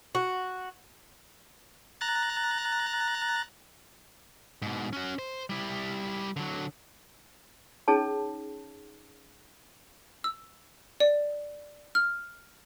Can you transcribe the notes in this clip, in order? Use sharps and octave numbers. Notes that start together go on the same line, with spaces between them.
F#4
A#5 F#6 A6
G#2 B2
C#4 F#4
C5
G3 E4
D3 F#3
C#4 D#4 G#4 C#5 A5
E6
D5
F6